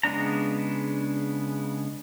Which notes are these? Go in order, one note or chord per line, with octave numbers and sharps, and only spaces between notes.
C#3 G#3 B3 D4 A#5